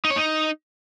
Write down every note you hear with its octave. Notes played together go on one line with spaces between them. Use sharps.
D#4
C#5
D#4